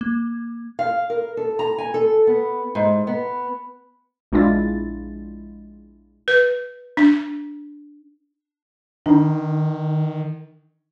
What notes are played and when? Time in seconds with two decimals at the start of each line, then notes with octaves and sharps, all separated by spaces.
0.01 A#3
0.79 F5
1.10 A#4
1.37 A4
1.59 A#5
1.78 G#5
1.94 A4
2.27 B3
2.75 G#2
3.07 B3
4.32 A#1 G#3 D4 E4 F4 A6
6.28 B4
6.97 D4
9.06 D#3 D4 D#4